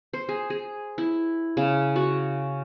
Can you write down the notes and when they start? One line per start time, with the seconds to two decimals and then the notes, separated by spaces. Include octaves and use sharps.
0.13 C5
0.29 G#4
0.50 G#4
0.98 E4
1.57 C#3
1.96 F#4